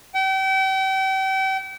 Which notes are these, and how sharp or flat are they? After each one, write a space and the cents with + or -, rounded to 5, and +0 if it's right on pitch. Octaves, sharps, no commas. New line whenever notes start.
G5 -35